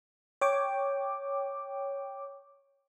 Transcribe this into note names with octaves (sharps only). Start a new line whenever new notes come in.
C#5 G5 D6